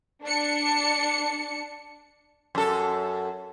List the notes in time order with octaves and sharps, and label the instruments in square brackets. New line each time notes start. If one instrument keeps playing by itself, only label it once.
[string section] D4 C#7
[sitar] F#2 A4